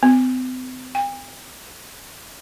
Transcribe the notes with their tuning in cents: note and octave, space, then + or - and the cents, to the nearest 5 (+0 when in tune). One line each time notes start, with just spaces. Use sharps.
C4 -45
G5 +45